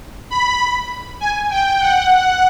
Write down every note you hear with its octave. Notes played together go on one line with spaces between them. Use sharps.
B5
G#5
G5
F#5